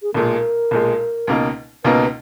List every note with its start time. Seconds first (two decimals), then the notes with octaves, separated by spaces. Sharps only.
0.03 G#4
0.14 B1 A#2 G#3 A#4
0.71 B1 A#2 G#3
1.27 C#2 B2 A#3 D#4
1.84 C#2 B2 A#3 D#4 B4